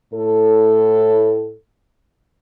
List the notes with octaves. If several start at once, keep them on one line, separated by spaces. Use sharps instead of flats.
A2 A4